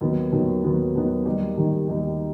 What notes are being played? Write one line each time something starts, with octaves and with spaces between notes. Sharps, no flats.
D#2 D#3 F#3 B3
D#2 D#3 F#3 B3
D#2 D#3 F#3 B3
D#2 D#3 F#3 B3
D#2 D#3 G3 D#4 G4
D#2 D#3 G3 D#4 G4
D#2 D#3 G3 D#4 G4